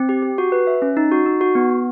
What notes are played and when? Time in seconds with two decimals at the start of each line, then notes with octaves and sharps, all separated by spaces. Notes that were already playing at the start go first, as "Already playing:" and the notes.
Already playing: C4
0.09 G4
0.23 G4
0.38 F#4
0.52 B4
0.67 E5
0.82 C#4
0.97 D#4
1.12 F#4
1.26 D#4
1.41 F#4
1.55 B3
1.70 B3